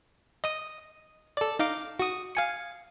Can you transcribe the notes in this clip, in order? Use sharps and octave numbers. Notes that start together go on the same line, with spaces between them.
D#5 D#6
A4 D5
D#4 F5 D6
F#4 D#6
F5 G#5 C#7